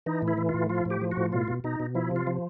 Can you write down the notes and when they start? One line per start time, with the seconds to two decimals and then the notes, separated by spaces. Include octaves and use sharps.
0.06 E3 D#4
0.22 A2
0.28 E4
0.38 E3
0.49 A2 F4
0.69 F3 F4
0.85 A2
0.90 G4
1.01 F3
1.11 F#4
1.17 A2
1.32 B2 F4
1.48 B2
1.64 B2 D#4
1.80 B2
1.95 F3 E4
2.11 C3 F4
2.27 F3